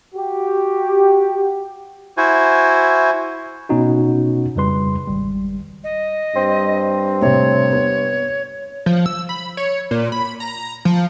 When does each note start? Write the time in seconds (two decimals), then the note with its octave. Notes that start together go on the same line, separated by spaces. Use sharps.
0.14 F#4 G4
2.17 E4 F#4 C5 G#5
3.69 B2 B3 C#4 D#4 F#4
4.56 F2 C#3 G3 B4 C6
5.07 G#1 G3
5.84 D#5
6.36 G2 C4
7.21 A2 C3 C#5
7.72 B3
8.86 F3
9.06 E6
9.29 B5
9.57 C#5
9.91 A#2
10.12 B5
10.40 A#5
10.85 F3